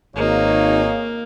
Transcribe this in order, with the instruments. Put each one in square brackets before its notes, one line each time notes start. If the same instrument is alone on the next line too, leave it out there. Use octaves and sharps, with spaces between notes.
[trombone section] G#1 [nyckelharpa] A#3 [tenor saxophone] D#4 [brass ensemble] G#4 C#5 F5